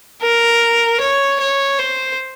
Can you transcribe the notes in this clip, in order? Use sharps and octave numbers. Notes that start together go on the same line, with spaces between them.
A#4
C#5
C#5
C5